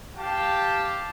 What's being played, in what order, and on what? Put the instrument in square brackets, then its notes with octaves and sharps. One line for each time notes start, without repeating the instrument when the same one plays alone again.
[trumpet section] G4 F5 G5 A5